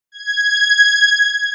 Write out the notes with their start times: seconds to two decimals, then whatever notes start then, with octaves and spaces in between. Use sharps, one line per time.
0.12 G#6